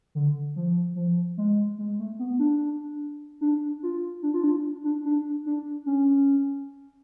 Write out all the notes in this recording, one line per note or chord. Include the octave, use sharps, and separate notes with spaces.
D3
F3
F3
G#3
G#3
A3
B3
D4
D4
F4
D4
F4
D4
D4
D4
D4
C#4